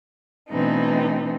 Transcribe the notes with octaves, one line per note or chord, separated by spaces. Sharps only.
B2 E3 A3 C4 D4 D#4